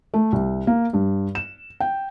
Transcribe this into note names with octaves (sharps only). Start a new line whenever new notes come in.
A3
C2
A#3
G2
E7
G5